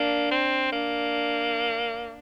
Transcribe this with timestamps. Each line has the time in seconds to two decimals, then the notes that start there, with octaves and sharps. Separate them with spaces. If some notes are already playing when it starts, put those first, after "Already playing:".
Already playing: A#3 D4
0.31 C4
0.72 A#3 D4